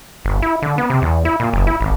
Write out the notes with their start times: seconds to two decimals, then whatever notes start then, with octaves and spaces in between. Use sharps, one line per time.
0.25 G1
0.42 E4
0.62 D3
0.78 B3
0.90 C3
1.02 E2
1.25 E4
1.40 A#2
1.53 F#1
1.67 E4
1.81 G#1